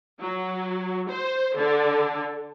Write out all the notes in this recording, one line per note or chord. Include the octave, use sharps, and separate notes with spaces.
F#3
C5
D3